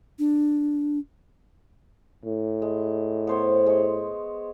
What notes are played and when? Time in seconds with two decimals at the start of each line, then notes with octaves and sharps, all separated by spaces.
0.19 D4
2.25 A2
2.62 G#3
3.27 B3 C5 C#5
3.66 G#3 C#5